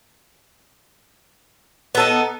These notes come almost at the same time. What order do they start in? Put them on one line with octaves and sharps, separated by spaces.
B3 A4 D#4